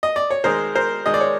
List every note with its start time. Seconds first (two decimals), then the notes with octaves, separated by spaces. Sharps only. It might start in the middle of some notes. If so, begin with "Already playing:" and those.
0.03 D#5
0.16 D5
0.30 C#5
0.44 D#3 G#3 A#4 C5
0.75 A#4 C5
1.06 D#3 G#3 D#5
1.14 D5
1.20 C#5